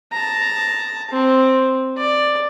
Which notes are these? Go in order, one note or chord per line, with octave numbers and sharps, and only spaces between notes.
A5 A#5
C4
D5